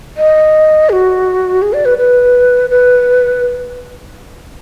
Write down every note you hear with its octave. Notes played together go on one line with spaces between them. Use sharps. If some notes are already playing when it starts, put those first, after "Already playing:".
D#5
G#4
F#4
G#4
D5
B4
B4
B4